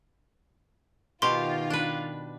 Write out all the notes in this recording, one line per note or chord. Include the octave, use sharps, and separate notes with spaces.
B2 D#3 F4 G4 F5 C6
D4 B4